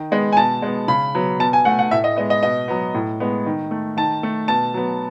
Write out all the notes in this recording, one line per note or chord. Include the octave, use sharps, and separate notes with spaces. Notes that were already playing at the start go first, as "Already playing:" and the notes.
Already playing: D#3
G#3 B3
G#5
B2 A5
G#3 B3
C#3 B5
F#3 B3
B2 A5
G#5
A3 F#5
F#5
A2 E5
D#5
G#3 B3 D#5
D#5
B2 D#5
F#3 B3
A2
G#3 B3
D#3
A3
D#3 A5
A3
B2 A5
F#3 B3